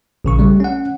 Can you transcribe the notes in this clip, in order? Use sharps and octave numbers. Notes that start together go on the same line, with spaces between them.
A#1 C#3 C#6
G3 A3
C#4 F#5